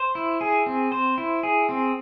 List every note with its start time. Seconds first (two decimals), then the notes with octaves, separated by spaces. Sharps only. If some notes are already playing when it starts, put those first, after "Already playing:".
Already playing: C5
0.15 E4
0.41 G#4
0.66 C4
0.92 C5
1.18 E4
1.43 G#4
1.69 C4